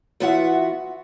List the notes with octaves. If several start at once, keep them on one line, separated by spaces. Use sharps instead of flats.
E3 B3 F4 F#4 E5 F#5